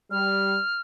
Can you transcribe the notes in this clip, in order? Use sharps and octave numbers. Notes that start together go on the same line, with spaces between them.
G3 F6